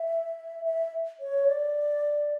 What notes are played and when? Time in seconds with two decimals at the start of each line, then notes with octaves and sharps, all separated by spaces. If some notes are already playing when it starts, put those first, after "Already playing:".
Already playing: E5
0.65 E5
1.20 C#5
1.48 D5